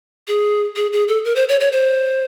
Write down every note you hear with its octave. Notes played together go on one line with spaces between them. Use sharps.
G#4
G#4
G#4
A4
A#4
C5
C#5
C#5
C5